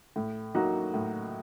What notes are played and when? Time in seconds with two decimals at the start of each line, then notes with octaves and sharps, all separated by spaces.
0.16 A2
0.55 F#3 A#3 D#4 F#4
0.94 A2